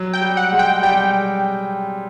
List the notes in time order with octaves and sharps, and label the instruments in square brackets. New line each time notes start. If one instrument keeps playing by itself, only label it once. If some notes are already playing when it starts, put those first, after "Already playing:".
Already playing: [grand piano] F#3
[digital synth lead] G5
[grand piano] G3
[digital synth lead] F#5
[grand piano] G#3
[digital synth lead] G5
[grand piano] G3 [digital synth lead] G5